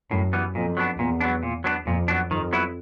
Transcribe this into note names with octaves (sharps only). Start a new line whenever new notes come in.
F#2 A2
E3 G3 B3
F2 A#2
F#3 B3 D4
E2 A#2
F#3 B3 D4
A#2
F#3 B3 D4
F2 A#2
F#3 B3 D4
F2 D#3
F#3 B3 E4